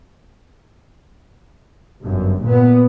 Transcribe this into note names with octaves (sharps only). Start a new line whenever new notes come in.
G1 F#2
A#2 B3